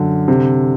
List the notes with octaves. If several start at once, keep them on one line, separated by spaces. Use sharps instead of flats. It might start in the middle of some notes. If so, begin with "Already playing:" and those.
Already playing: F#2 D3
C3